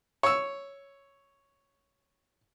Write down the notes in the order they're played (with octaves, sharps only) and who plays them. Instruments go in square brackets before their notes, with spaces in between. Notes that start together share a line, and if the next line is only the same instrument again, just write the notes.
[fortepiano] C#5 E6